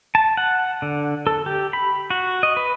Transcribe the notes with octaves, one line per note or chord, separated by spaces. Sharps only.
A5
F#5
D3
A4
G4
B5
F#4
D#5
B4